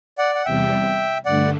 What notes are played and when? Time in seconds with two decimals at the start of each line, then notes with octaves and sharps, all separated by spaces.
0.18 D5 F#5
0.35 F#5
0.45 E2 C3 G3 E5 G5
1.26 G2 D3 A3 D5 F#5